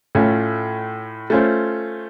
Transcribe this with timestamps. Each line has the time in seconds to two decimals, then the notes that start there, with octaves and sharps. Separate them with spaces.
0.15 A2 A3 C#4 F4
1.30 A3 C#4 F4 C5